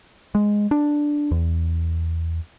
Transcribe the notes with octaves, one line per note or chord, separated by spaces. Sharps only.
G#3
D4
E2